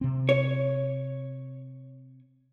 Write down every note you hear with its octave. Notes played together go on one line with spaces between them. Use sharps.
C3 C4
C#5